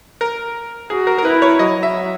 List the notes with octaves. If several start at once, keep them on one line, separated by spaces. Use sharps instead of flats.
A#4
F#4 G#4
A#4
A#4
E4 B4
C#5
F#3 D#5
E5